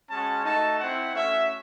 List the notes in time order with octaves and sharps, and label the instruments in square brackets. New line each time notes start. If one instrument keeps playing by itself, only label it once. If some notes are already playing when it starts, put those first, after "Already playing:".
[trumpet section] G#3 C#4 F#4 A5
A3 D#4 F#4 A5
C4 E4 F#5
A3 C#4 F#4 E5